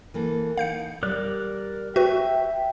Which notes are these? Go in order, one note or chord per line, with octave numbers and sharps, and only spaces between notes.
E3 A#3 A4
D#4 F5 G6 C#7
G3 A#4 D5 F#6
F#4 B4 E5 G5